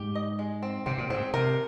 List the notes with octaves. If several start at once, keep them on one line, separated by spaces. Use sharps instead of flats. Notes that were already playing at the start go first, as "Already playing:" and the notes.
Already playing: G#2 G4
D#5
G#3
C4
C3 C4
A#2
G#2 C4
C3 A#4